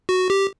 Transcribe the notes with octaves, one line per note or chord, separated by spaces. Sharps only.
F#4
G4